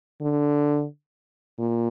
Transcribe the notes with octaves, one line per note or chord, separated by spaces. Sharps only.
D3
A#2